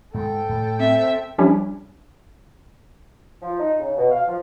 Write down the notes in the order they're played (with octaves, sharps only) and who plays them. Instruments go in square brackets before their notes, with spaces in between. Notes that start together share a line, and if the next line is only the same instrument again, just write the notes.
[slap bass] G#2 G#3 [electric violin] A4 G5
[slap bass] A2
[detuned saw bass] C4 [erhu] E5
[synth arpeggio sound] F3 G3 C#4 D4 E4 G4
[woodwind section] F3
D#4
C#3
B2
F5
F3